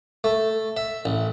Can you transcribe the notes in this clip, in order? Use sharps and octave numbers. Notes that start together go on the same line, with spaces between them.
A3
E5
A1